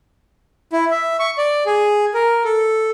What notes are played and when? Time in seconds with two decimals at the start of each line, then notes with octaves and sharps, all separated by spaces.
0.73 E4
0.91 E5
1.20 C#6
1.38 D5
1.66 G#4
2.14 A#4
2.44 A4